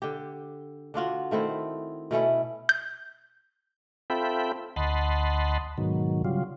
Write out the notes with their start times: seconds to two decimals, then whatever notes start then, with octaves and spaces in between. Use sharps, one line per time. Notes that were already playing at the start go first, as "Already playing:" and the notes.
0.02 D3 G4
0.94 D3 D4 F4 F#4
1.31 D#3 A3 C4 E4
2.11 B2 A3 C#4 E4
2.69 G6
4.10 C4 F4 A4 E5 G5 B5
4.76 D2 D#5 F#5 A5 B5 C6
5.78 G#2 B2 D#3 F#3
6.25 C#3 F#3 G3 F4